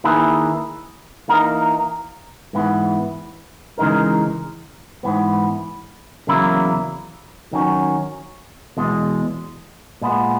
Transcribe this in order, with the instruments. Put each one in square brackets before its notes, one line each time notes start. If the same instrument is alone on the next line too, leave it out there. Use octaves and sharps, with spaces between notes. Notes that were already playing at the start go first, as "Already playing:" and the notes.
[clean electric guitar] D#3 A#3 E4 G#4 B4
E3 A#3 D#4 A#4
G#2 E3 B3
C#3 E3 G#3 D#4 A#4
G#2 E3 B3
E2 C#3 F#3 A#3 E4
D#3 F#3 C#4
E2 B2 G#3
A#2 G#3 B3